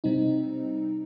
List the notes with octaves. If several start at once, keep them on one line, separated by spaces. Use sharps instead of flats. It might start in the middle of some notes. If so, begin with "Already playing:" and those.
C3 G3 C4 D#4